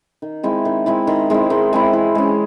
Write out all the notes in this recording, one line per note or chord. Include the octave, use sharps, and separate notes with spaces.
D#3
G#3 C4 E4
D#3
G#3 C4 E4
D#3
G#3 C4 E4
D#3
G#3 C4 E4
E3
G#3 C#4